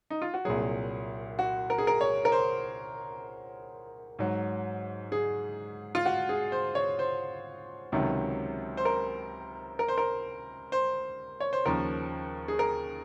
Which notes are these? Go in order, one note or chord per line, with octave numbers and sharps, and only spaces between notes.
D#4
F4
F#4
C2 A#2 F#3 G#4
F#4
A#4
G#4
A#4
C#5
A#4
C5
G#2 F#3
G#4
F4
F#4
G#4
C5
C#5
C5
C#2 C3 D#3 F#3
C5
A#4
A#4
C5
A#4
C5
C#5
C5
D#2 C#3 F3 A#4
G#4
A#4